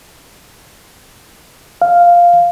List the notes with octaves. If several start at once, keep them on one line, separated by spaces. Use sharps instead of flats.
F5